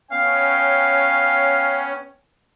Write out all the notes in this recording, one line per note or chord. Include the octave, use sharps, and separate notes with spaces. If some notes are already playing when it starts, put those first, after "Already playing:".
B3 C#4 C#5 F5 G5